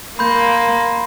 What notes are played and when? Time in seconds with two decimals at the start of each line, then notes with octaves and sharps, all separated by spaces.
0.19 A#3 B5 C6 G6